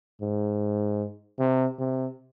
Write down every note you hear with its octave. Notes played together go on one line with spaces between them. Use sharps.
G#2
C3
C3